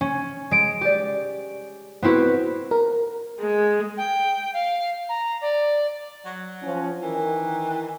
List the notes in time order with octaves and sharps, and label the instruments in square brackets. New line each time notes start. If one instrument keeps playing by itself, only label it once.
[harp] C#4
G#3 D7
G4 D5
B3 C4 E4 F#4 B4
[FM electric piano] A#4
[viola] G#3
[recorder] G5
F5
A#5
D5
[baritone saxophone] F#3
[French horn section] F3 C#4
[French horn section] D#3 A#4 [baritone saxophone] E3